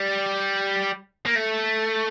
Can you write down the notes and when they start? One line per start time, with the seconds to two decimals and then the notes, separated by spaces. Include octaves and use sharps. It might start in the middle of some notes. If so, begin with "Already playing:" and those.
Already playing: G3
1.26 A#3
1.36 A3